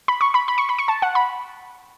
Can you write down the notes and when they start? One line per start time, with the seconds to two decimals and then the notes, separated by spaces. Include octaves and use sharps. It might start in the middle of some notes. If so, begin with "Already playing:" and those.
0.08 B5
0.21 C#6
0.34 B5
0.48 B5
0.58 C#6
0.69 B5
0.78 C#6
0.88 A5
1.02 F#5
1.15 B5